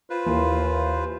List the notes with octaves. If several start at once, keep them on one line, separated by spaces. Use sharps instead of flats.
F4 B4 C5
D#2 E3 A#3